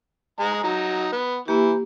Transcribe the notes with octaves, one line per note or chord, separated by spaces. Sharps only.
G#3 G#4 A#5
F#3 D#4
B3
E3 A#3 G4